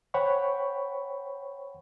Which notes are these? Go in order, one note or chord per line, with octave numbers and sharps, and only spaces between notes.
C5 C#5 F#5 G5 B5 C#6